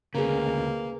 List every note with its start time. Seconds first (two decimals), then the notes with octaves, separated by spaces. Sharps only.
0.15 D2 C#3 A#3 G#4 B4